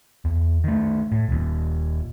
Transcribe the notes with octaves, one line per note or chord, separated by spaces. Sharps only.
E2
D#3 A3
A2
D#1 D#2